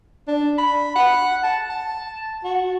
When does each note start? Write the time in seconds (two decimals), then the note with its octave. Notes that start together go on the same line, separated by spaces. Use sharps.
0.28 D4
0.58 B5
0.96 F#5
1.44 A5
1.70 A5
2.44 F#4